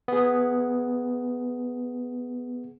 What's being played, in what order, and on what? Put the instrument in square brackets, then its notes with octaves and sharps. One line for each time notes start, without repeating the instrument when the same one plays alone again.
[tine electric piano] B3 G#4